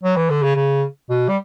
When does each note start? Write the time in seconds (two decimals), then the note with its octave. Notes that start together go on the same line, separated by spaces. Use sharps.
0.03 F#3
0.16 E3
0.30 D3
0.43 C#3
0.56 C#3
1.10 B2
1.29 G3